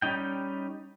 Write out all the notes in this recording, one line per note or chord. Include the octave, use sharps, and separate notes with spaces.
G3 C#4 D#4 G5